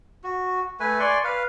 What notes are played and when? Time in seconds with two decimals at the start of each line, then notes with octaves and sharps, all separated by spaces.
0.24 F#4
0.80 A3 B4 G#5
1.00 D5 G#5 C6 C#6
1.24 B4 F5